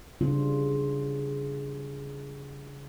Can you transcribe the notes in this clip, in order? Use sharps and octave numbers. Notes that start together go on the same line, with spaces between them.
C#3 G3 D4 F4